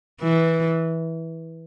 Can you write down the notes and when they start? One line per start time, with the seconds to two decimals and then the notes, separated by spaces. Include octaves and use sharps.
0.21 E3